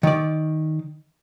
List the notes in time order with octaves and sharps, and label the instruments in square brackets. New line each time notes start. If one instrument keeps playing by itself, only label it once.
[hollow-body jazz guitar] D#3 D5